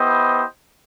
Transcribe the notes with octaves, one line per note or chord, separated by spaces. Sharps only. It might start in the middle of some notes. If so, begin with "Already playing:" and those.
Already playing: B3 E4 G4 C5 D#5